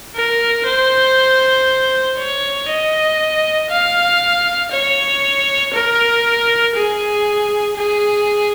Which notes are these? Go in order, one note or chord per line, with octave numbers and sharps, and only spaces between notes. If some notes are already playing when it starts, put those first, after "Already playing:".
A#4
C5
C#5
D#5
F5
C#5
A#4
G#4
G#4